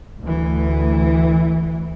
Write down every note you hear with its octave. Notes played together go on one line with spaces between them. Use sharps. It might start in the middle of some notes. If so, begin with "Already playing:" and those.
D2 E3